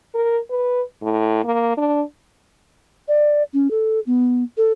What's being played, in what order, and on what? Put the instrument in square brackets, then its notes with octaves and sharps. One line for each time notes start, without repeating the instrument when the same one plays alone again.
[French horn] A#4
B4
A2
A#3
D4
[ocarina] D5
C#4
A4
B3
A4